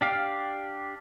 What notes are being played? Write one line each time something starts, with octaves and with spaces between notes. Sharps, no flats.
D4 G4 F5